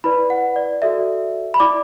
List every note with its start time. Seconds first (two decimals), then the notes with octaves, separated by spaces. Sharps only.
0.04 E4 B4 D5 B5
0.30 F#5
0.56 D5
0.82 F#4 A4 D5 E5
1.54 B5
1.60 E4 D5 D6